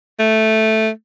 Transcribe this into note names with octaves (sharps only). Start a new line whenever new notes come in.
A3